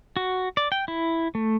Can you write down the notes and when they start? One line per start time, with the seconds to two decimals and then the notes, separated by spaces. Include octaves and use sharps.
0.17 F#4
0.57 D5
0.72 G5
0.88 E4
1.35 A3